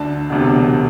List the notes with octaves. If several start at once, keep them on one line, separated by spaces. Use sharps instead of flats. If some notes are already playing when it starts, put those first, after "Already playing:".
Already playing: D2 D3 A5
E1 D2 C3